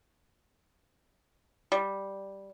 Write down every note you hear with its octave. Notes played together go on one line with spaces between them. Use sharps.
G3